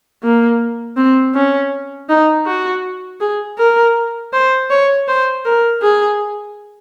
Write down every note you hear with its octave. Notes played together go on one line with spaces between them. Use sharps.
A#3
C4
C#4
D#4
F#4
G#4
A#4
C5
C#5
C5
A#4
G#4